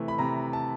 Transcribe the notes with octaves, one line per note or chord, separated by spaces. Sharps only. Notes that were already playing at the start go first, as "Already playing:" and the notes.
Already playing: C3 E3 A3
B5
C3 A#5
A5